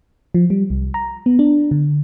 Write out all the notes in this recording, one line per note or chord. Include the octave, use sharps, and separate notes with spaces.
F3
G3
C2
A#5
B3
D4
D3